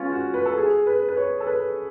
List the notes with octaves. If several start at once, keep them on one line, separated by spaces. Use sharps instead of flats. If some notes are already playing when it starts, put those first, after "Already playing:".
Already playing: G#3 B3 C#4 F4
F#4
B4
A4
G#4
B4
B4
C#5
A4
B4